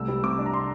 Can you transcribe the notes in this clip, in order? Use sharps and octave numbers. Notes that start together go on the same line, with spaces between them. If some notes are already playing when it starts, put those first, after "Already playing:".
Already playing: C2 A3 E6
G3
C3 D6
D4
A#5
C6